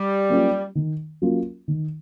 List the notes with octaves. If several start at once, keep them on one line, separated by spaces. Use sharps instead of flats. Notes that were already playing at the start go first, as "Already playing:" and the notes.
Already playing: G3
F#3 A#3 C#4 F4
D#3
F#3 A#3 C#4 F4
D#3